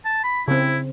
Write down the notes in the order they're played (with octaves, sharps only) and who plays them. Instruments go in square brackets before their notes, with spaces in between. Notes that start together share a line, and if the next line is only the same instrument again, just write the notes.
[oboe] A5
B5
[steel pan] C#3 C4 [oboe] E4